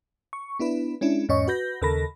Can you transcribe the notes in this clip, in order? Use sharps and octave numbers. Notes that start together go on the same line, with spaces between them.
C#6
B3 D4 E4 B4
G#3 C#4 D4 E4
E2 G#2 C#4 C#5 D#5 C#6
F#4 B4 G6 A#6
D#2 C#3 A4 A#4 B5 A#6